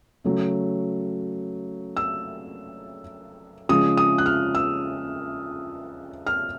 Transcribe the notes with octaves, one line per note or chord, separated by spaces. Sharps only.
C#3 F#3 A3
E6
C#3 F3 G#3 D#6
D#6
F#6
F6
E6
F6